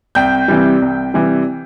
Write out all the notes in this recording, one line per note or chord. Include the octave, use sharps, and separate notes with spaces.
C2 G5 G6
C3 E3 G3
C2
C3 E3 G3